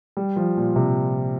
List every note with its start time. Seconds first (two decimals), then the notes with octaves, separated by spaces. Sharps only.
0.17 G3
0.36 F3
0.57 A#2
0.76 C3